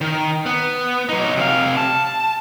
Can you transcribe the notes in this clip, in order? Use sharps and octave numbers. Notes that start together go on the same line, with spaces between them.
D#3
B3
F#3 D#4
C3 F5
A5